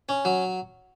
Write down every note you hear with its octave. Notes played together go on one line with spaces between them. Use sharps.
C#4
F#3